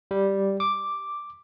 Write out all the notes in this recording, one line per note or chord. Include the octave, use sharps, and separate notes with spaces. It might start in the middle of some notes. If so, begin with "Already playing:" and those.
G3
D6